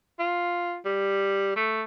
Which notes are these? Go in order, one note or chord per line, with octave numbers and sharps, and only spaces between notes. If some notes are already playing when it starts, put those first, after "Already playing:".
F4
G3
A3